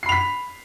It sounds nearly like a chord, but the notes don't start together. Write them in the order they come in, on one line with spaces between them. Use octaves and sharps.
C7 B5 F7 B6